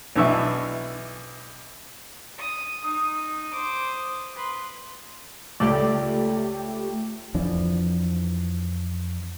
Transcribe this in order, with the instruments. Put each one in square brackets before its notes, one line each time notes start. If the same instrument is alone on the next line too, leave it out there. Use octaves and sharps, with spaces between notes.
[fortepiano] B1 E3 D4 E5 C#6
[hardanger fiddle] D#6
[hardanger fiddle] D#4 [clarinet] D#6
[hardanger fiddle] C5 D6
B4 C6
[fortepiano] C#2 D5 [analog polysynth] A3 G4
[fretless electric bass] F2 E3 F3 D4